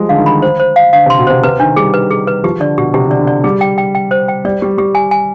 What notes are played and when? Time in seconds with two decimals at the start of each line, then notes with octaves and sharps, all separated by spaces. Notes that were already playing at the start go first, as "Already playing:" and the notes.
Already playing: F3 G3 G#3
0.09 D3 F5
0.17 D#3
0.26 B5
0.42 C5
0.60 C5
0.76 F5
0.93 D3 F5
1.06 C3
1.10 C6
1.19 B2
1.27 C3 C5
1.43 C3 B4
1.60 D#3 D4
1.76 G3 G#4
1.94 B4
2.10 G#4
2.28 B4
2.44 F3 G4
2.60 D3 D5
2.78 B2 G4
2.94 C3 G4
3.07 D3
3.11 D5
3.19 D3
3.27 D5
3.44 G3 G#4
3.61 G5
3.78 G5
3.95 G5
4.11 C5
4.28 G5
4.45 G3 D5
4.62 G3 G4
4.78 G3 G4
4.95 G#5
5.11 G#5